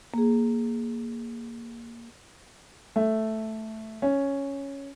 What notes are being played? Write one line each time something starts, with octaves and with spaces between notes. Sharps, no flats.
A#3 G#4
A3
C#4